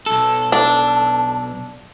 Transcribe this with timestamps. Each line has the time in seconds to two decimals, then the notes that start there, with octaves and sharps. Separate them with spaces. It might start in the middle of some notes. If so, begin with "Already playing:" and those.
0.06 B1 A4
0.52 D4